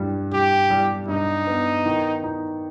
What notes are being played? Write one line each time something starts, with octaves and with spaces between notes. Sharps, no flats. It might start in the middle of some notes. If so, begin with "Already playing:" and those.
Already playing: G2 G3
G3 G4
G3
G2 D#4
B3
D#3
D#4